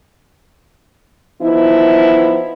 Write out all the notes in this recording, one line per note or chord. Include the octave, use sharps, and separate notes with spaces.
F3 B3 D#4 E4